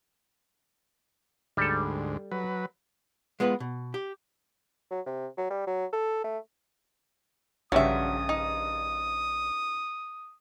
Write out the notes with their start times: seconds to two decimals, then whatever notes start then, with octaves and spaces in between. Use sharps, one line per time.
1.57 D2 G#2 G3 A4
2.32 F#3 B4
3.40 G#3 B3 F4 B4
3.60 B2
3.94 G4
4.91 F#3
5.06 C3
5.38 F#3
5.50 G3
5.67 F#3
5.93 A4
6.24 A3
7.72 A#1 G2 C#3 F#3 E5 D#6
8.29 D#4